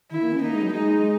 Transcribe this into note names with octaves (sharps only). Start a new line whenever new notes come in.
D#3 E4
A#3
C#4
A#3 D#4
G#3
F#3
G#3 D#4